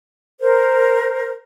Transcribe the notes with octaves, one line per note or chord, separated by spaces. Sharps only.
A#4 C5